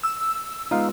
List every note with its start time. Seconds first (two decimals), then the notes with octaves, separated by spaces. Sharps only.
0.03 E6
0.71 G#3 B3 D#4 F4 F5